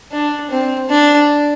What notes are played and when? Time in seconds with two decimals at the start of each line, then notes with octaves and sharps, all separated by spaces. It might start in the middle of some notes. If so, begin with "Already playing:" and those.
0.12 D4
0.51 C4
0.89 D4